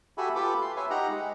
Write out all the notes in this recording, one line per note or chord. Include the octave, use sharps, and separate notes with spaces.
F#4 G4 A4 E5 G#5 B5
F4 G4 A4 B4 B5 D6
C6
B4 C#5 E5 G#5
D#4 G4 F#5 A#5
G#3